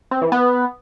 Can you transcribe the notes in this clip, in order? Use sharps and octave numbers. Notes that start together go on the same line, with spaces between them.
C4
E3
B3